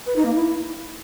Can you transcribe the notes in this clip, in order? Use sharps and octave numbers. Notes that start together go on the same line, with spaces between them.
B4
D#4
A#3
E4